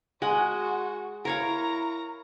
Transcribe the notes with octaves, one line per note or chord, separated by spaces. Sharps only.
G#3 F#4 F#5 G#5
E4 A#4 C#5 F5 A#5